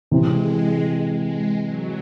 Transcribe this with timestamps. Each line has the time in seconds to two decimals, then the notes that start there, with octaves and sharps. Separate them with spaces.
0.11 C3 E3 G#3 C4
1.14 G#3
1.64 F#3